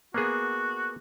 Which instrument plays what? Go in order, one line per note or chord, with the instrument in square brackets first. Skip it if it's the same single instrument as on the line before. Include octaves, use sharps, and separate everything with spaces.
[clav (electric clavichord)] A#3 B3 G#4 [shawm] F#4